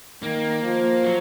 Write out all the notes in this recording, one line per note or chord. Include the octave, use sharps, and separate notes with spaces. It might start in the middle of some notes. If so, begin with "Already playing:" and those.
D#3 A#3
F3
F#3